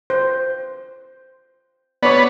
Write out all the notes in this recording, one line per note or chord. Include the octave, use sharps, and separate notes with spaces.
C5
B3 C#5 D5